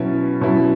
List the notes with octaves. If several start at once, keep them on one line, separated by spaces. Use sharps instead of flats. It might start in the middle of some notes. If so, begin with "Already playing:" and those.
Already playing: B2 F#3 C#4 E4
B2 F#3 C#4 E4